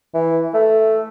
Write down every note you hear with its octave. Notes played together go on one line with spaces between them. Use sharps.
E3
A3